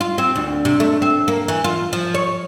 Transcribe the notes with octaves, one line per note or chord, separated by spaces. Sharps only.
F4
C4
D2
C3
A3
C4
A#3
E3
F4
F3
C#5